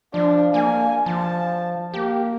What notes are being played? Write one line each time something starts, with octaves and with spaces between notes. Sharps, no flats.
F3 D4
A#3 G#5
F3 A5
A#3 G4